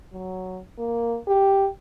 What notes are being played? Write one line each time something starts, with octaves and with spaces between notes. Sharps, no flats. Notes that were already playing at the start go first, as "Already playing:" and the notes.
F#3
A#3
G4